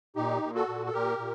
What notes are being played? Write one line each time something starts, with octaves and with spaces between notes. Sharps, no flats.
A#2 D#4 G4
A#2
F#4 A4
A#2
A4
A#2 G4 A#4
A#2